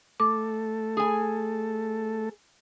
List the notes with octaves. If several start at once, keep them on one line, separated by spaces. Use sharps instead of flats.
A3 A4 D6
G#4 G#5